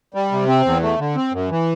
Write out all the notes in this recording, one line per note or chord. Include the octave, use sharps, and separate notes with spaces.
G3
C3
C4
E2
A3
D3
C4
F#2
E3